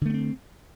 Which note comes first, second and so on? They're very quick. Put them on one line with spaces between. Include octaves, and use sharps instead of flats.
D3 A3 B3 C4